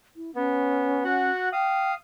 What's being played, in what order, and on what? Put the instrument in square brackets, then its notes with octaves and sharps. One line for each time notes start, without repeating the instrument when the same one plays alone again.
[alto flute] E4
[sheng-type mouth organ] B3 [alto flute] C#4
[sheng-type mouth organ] F#4 F#5
[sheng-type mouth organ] F5 D#6 [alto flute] G5